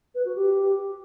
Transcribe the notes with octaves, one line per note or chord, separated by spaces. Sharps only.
B4
F#4
G4